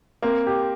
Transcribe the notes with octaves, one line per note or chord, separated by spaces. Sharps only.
A#3 C4
G4